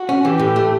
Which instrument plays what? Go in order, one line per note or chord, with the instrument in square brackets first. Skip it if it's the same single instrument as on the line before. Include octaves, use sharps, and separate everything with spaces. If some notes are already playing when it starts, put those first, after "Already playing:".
Already playing: [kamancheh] F#4
[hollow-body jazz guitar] C#4
[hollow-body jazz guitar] E3 [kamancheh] G4
[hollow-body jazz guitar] A2
A3